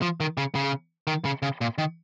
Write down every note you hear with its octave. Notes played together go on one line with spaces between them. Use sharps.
F3
D#3
C#3
C#3
D#3
C#3
C#3
A#2
D#3